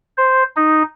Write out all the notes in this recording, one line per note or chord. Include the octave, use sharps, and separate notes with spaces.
C5
D#4